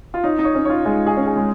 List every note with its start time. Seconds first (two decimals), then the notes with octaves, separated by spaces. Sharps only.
0.14 F4
0.24 D#4 C#5
0.39 D#4
0.44 C#5
0.55 C#4
0.65 F4 C#5
0.85 G#3 F4
1.06 G#4
1.17 C#4
1.26 G#4
1.36 G#3